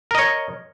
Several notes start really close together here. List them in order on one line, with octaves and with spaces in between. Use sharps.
A#4 D#5 C#5